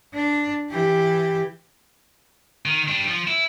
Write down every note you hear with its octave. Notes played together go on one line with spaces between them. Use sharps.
D4
E3 G4
D#3
G3 D4
F3
E4